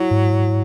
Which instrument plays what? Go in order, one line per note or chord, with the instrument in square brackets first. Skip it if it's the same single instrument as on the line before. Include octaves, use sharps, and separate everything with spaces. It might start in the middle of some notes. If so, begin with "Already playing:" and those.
Already playing: [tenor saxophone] F#3 [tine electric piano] E4
[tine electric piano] G#2